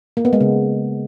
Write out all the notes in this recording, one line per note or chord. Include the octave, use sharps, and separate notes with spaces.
A#3
B3
G#3
C#3